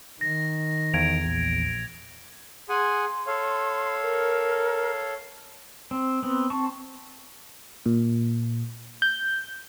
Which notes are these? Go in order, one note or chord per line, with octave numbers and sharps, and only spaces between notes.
D#3 A#6
E2 G#6 D7 F7
A#1
G#4 F#5 G#5 C6
A4 C#5 F5
A#4
C4
B3 C4
C4 A5 C#6
A#2
G6